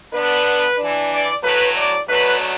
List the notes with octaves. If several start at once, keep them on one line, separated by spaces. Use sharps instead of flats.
D3 B3 D4 B4
E3 D4
D5
A2 F#3 A3 B4
D5
B2 F#3 A3 D4 B4